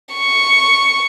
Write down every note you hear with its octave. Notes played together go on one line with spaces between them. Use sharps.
C#6